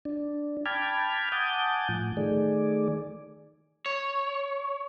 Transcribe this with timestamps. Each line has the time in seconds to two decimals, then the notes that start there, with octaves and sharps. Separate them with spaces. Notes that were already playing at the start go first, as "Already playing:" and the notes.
0.05 D4
0.66 G5 A5 B5 D6 F6 G#6
1.32 F#5 G#5 A5 D6 D#6 G6
1.89 A2 F3
2.17 D#3 A3 G#4 D5
3.86 C#5